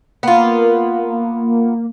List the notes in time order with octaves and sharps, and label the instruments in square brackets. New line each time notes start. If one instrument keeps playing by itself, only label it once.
[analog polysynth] A#3 [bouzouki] B3 F4